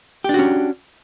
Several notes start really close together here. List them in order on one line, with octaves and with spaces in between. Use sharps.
G4 D4 F#4 C#4